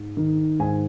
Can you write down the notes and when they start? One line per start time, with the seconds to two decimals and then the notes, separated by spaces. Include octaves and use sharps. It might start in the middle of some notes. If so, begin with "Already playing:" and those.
Already playing: G#2
0.17 D#3
0.60 G#2 G#5